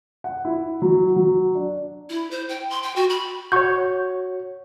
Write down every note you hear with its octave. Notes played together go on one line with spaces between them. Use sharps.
F#5
E4
F#3
F#3
D4
E4
C5
G5
C6
G5
F#4
B5
F#4 C#5 C#6 G6